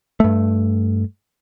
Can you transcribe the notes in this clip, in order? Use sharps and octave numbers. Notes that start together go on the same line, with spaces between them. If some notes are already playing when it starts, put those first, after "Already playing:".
G2 A3